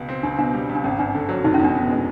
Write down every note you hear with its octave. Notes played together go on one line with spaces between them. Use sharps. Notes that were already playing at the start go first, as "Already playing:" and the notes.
Already playing: C#2 B2
C4
C#2 D4
B2 D4
G3
C#2
D4
G#1 C#4
G2 D4
D3
F#3
F1 D#4
C#4
E2 D4
B2
G#3